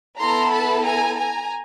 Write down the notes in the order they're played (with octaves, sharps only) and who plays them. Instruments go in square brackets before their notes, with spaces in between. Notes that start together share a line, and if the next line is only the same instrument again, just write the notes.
[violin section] B3 E4 A4 A#5 C6
A5 B5
G#5 A#5
G#5 A#5